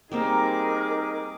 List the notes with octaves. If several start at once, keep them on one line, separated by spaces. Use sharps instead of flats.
G3 A#3 C4 D#4 G#4 A#4 D6